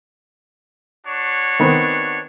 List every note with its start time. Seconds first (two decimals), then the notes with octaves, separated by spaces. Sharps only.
1.07 D4 F#4 C#5
1.60 D#3 B3 C4